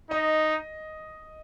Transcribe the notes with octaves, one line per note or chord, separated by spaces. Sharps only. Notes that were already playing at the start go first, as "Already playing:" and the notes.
D#4 D#5